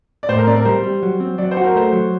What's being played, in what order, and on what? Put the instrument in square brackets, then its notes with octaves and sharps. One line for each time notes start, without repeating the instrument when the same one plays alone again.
[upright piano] D5
[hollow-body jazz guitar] A2 [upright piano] C5
[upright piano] A#4
[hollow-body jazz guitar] C4 [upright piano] D5
[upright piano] A#4
[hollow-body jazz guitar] G3 [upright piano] C5
[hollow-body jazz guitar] G3
F#3
C4
[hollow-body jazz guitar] F#3 [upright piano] D5
[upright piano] C5
[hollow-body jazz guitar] F#4
[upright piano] A#4
[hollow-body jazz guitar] A3 [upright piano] C5
[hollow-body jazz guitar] F#3